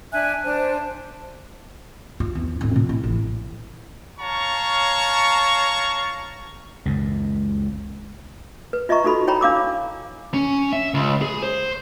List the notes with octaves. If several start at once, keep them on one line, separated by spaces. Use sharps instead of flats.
D4 E5 G#5 F#6
D4 C5 A5
F4
E2
D1
A#2
E4
A1
C#5 F5 A5 A#5 C#6
C#2 F#2
B4
F4 D#5 E5 A#5 C#6
D#4 F#4 A4 B5
E4 C#5 G5 A#5 B5
D4 F5 D6 E6
C#4
E5
C#2
G#4
C5